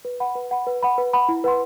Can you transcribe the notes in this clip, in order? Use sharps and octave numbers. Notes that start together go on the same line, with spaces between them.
B4
F#5 B5
B4
F#5 B5
B4
F#5 B5
B4
F#5 B5
E4
B4 F#5 C6